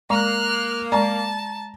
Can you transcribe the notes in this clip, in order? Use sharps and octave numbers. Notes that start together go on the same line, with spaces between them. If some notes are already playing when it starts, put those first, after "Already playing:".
G#3 A#3 A#5 F6 F#6
G#3 D5 A5 A#5